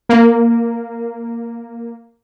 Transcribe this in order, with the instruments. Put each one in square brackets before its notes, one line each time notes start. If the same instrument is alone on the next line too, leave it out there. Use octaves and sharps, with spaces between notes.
[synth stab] A#3